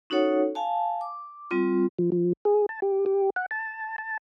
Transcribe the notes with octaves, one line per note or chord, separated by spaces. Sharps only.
C#4 D#4 F#4 A4 C#5 F#5
F5 G#5 A5
D6
G3 C4 F4
F3
F3
G#4
A5
G4
G4
F#5
A5
A5